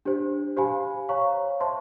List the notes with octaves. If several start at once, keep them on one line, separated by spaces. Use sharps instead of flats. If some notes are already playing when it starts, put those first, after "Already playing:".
D4 G4 C5
G4 C5 F5 G#5 B5
C#5 F5 A#5 C#6
C5 E5 A5 C6